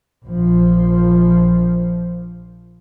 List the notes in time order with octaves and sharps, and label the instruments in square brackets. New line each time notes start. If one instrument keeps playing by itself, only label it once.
[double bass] A#1 F3